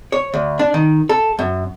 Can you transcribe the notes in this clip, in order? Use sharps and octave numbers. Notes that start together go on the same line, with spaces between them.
C#5
D2
D4
D#3
A4
F#2